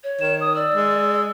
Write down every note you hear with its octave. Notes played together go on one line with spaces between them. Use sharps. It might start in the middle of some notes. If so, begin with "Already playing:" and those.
C#5
D#3 E7
D#6
D5 E6
G#3